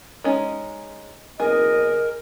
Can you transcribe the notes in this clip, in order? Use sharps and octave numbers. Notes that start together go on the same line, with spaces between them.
G#3 C#4 D#4
F#1 B2 G#4 A#4 D#5